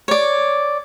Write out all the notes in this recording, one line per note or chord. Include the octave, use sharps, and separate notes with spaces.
C#5 D5